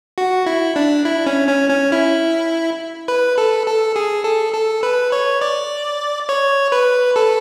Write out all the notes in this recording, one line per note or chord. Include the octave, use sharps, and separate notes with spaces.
F#4
E4
D4
E4
C#4
C#4
C#4
E4
B4
A4
A4
G#4
A4
A4
B4
C#5
D5
C#5
B4
A4